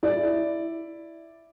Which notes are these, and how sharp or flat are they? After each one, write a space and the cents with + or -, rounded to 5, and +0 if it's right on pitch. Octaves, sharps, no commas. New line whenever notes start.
E4 +0 D5 +0